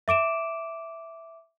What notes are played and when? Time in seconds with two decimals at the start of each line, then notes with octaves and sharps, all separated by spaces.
0.08 E5 D6 D7 E7